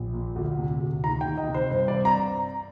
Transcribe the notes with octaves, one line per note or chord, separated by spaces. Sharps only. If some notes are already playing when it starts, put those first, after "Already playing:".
Already playing: A#1
A#2
D2
C3
D2
D#3 A#5
D#3 G5
D#5
C3
C5
G2 C5
D5
C4
A#5